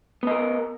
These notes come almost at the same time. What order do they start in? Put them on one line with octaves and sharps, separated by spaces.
B3 D#5 A#4